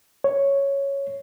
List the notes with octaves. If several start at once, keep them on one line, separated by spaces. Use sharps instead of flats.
C#5